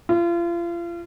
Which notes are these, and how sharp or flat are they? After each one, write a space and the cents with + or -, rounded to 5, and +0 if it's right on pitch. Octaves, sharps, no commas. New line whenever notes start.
F4 -35